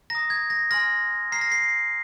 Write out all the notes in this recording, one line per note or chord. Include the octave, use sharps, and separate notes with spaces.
A#5 D#6 A#6
G#6
A#6
G#5 C6 F6 A#6
A#5 F6 C7
A#6
C7